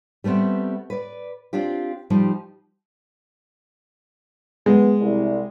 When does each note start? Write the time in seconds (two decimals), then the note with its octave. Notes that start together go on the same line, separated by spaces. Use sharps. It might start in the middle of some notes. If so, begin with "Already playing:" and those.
0.24 G3 A3 B3 C4 E5
0.90 B4 D5
1.53 C4 D4 F4 G4
2.10 F3 G3 D#4 G4 C5
4.66 G#3 B3
5.00 C2